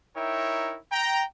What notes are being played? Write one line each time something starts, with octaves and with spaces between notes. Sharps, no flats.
D#4 E4 A#4 C#5 E5 G5
G5 A#5